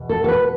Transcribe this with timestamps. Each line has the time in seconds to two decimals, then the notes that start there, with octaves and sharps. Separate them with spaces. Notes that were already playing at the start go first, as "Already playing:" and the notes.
Already playing: E2 B2
0.09 A4
0.24 A4
0.28 B4